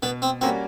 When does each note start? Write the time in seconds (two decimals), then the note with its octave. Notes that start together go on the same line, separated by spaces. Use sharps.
0.03 B2 B3
0.22 C4
0.41 G3 A#3 C4 C#4 F#4